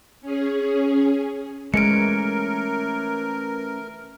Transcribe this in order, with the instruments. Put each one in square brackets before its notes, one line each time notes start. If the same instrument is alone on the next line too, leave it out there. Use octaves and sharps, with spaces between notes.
[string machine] C#4 G#4
[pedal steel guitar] E3 A3 C#4 [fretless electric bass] G#3 [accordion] A#4 [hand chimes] C#7 D7